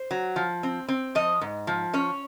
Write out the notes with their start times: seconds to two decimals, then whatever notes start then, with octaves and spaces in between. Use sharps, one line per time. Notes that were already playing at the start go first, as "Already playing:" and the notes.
Already playing: C5
0.11 F#3
0.36 F3
0.63 C4
0.88 C4
1.15 F3 D#5
1.41 G#2
1.67 F3
1.94 C#4 C#5